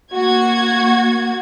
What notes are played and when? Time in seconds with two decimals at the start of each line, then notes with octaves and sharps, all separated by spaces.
0.12 A#3 F#4 G#6